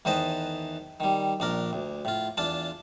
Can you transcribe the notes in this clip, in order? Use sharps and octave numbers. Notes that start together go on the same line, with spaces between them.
E2 D#3 B4 C5 D#5 A5
D#3 G3
A#1 D4 A#4
D2
A2 F4
E2 D4 F4 A5